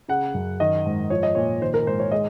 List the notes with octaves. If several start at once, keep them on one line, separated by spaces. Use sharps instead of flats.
C#3 F#5
F#2
D#3 D#5
G#2
F3 C#5
D#5
A#2 C#5
D#3 C5
A#4
G#2 C5
C#5
G#3 D#5